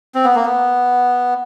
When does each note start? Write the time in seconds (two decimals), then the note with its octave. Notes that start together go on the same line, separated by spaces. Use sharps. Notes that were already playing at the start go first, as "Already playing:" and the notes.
0.15 C4
0.25 B3
0.35 A#3
0.45 B3